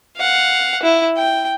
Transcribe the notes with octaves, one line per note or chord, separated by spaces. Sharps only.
F5 F#5
E4
G5